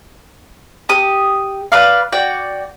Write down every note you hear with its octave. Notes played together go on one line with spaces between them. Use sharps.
G4 D#6
B4 D5 F5
F#4 D5 G5